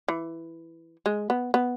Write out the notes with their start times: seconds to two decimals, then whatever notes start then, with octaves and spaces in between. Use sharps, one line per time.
0.08 E3
1.06 G#3
1.30 B3
1.54 B3